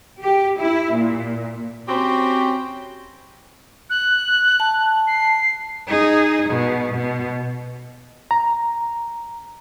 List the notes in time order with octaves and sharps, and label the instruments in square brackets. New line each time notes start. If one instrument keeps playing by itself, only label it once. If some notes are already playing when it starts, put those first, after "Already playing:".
[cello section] G4
E4
A#2
[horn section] C4 C#4 F#4 G4 C5 B5
[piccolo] F#6
[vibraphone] A5
[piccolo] C7
[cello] D#4 G#4
B2
B2
[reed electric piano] A#5